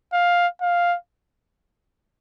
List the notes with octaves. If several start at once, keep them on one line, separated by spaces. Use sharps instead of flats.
F5
F5